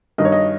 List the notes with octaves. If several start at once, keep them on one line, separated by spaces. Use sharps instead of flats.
G2 D#3 D#5
C#5
D#5